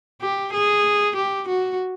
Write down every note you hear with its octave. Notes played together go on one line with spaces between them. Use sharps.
G4
G#4
G4
F#4